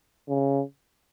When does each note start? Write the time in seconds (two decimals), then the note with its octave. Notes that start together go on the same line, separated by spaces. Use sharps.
0.29 C#3